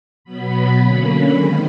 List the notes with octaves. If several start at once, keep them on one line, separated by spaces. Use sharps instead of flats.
B2 F#3 B3 B5
D3 F#3 A#3 C#4
D#3 G#3 C4